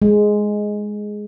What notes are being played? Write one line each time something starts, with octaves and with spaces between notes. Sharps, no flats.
G#3